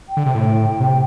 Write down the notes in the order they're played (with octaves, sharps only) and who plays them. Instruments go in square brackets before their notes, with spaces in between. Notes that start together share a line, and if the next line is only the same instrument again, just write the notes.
[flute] G5
[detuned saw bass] D3
C3
A2
C3